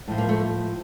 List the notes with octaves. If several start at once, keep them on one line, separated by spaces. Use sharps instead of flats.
A2 F3
A#3
A3